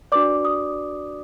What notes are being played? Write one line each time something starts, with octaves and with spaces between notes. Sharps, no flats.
D4 F#4 B4 D5 D6
D#6